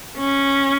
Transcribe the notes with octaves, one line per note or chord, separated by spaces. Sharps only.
C#4